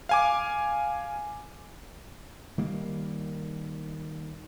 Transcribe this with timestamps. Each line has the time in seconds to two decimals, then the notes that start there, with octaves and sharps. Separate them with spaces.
0.09 F5 G#5 D6
2.58 D#3 G3 A#3